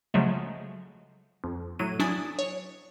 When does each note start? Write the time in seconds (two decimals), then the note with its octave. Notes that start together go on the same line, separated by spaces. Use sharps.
0.14 C#3 F3 F#3 G#3 A3
1.44 F2
1.79 A2 F#3 D#7
1.99 F#3 D4 E4 G#5 D#6 A6
2.39 C#5